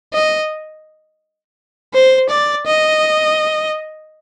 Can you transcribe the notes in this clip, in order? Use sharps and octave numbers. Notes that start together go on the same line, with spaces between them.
D#5
C5
D5
D#5